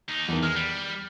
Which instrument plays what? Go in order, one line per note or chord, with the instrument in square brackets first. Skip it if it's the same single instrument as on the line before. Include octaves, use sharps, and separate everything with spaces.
[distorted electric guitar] D#2 D#4
[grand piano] E2 D#3
[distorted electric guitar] G#3 [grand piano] F6
[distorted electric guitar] G3